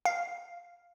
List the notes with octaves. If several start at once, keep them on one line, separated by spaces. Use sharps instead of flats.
F5